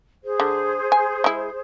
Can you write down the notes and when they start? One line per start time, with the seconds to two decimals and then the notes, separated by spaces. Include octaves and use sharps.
0.23 G#4 C5
0.40 D3
0.92 G#5
1.24 G#3 E4